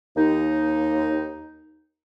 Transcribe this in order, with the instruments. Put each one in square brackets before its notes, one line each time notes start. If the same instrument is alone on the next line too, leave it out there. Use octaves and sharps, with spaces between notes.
[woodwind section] D#2 D#4